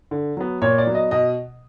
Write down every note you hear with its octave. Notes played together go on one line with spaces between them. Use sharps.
D3
F#3 B3
A#2 C#5
D5
F#3 B3
D#5
B2 D#5